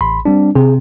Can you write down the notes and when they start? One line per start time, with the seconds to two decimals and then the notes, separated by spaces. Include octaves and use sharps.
0.01 A1 B5 C6
0.25 G3 C4 D4
0.55 C3 G#4